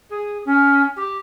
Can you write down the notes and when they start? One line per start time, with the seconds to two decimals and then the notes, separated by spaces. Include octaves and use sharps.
0.09 G#4
0.45 C#4
0.96 G4